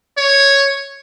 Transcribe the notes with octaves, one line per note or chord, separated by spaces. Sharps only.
C#5